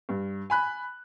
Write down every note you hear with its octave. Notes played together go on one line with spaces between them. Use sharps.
G2
G#5 B5 F#6